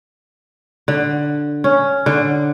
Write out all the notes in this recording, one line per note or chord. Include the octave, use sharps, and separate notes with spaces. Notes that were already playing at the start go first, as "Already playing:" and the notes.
D3
C#4
D3